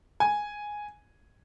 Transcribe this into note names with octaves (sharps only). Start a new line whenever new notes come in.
G#5